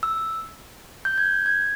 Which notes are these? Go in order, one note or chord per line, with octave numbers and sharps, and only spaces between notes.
E6
G6
G#6
G6
G#6